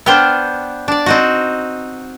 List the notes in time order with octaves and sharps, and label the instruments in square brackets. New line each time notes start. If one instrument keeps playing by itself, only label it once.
[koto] B3 D4 [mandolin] C5 G5 F6
[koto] D4 D5
C4 D#4 F#4